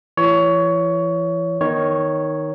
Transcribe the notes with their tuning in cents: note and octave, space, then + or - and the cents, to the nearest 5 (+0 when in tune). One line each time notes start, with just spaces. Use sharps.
E3 +35 C#5 +20
D#3 +0 B3 -30 C#5 +0